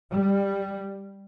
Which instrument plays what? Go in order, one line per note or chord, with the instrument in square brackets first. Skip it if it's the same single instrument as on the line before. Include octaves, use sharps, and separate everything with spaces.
[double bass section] G3